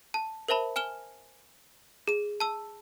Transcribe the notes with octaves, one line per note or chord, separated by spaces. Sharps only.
A5
A#4 C5 E5 A5 B5
G#5 F6 E7 G7
G#4 D#7
A5 E6